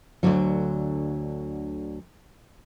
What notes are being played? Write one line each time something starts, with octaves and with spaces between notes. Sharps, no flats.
D2 G2 D3 F#3